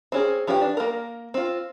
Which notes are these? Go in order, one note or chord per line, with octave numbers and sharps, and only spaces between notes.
C4 C#4 G#4
F3 C#4 G4 B4 G5
D4
A#3 A#4
C4 F4